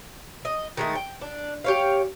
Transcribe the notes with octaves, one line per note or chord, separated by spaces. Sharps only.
D#5
D#3 G#3 A3
G5
D4
G4 C#5 F5